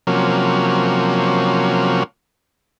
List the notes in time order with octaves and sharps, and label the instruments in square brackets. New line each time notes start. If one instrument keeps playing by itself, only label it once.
[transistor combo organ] C3 F3 F#3 A#3 C#4